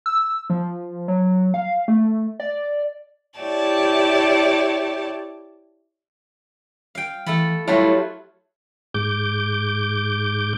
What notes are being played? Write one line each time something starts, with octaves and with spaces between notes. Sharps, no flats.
E6
F3
F#3
F5
A3
D5
E4 G4 C#5 D5 A5
F5 G5
E3 A3 A4 B5
F#3 G3 A3 E4 F4 C#5
G#2 D6 G6